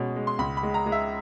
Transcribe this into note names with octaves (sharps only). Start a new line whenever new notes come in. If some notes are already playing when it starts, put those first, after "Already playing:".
Already playing: B2 G#3 C#4
G#3
C6
C#2 B5
B5
G#3
A#5
G#3
E5